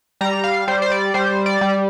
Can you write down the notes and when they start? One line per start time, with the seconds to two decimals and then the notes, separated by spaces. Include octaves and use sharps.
0.21 G3 A#5
0.44 F5
0.68 G3 C5
0.82 C5
0.92 D5
1.14 G3 C5
1.46 D5
1.61 G3